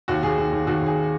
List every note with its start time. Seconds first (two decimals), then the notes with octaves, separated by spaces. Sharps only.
0.08 D#2 F#4
0.23 D#2 G#4
0.38 D#2
0.52 D#2
0.67 D#2 F#4
0.82 D#2 G#4